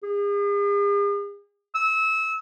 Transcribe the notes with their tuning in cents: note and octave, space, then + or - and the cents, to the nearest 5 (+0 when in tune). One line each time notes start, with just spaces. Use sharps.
G#4 -45
E6 -25